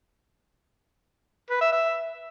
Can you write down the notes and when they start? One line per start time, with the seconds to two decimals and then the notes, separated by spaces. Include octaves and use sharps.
1.50 B4
1.61 E5
1.72 E5